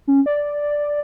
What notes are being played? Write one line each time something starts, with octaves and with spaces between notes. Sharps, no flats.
C#4
D5